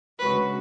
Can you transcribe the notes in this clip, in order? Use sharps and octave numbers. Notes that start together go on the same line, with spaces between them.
D2 C#3 G#3 C#4 F#4 B4